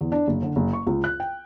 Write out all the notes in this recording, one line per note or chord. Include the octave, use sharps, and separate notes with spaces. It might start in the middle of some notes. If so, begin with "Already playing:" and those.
E2
D4
F#1
D3
F#1
C#6
C#2
F#6
G5